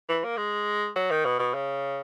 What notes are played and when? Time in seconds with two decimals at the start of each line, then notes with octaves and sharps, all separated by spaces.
0.09 E3
0.24 A#3
0.37 G#3
0.95 F#3
1.11 D#3
1.25 B2
1.39 B2
1.54 C#3